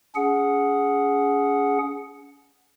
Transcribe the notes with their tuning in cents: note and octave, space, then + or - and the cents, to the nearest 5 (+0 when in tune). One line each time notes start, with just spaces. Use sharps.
C#4 +35 G#4 +0 F#5 -5